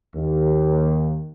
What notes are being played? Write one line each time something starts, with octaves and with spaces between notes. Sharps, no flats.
D#2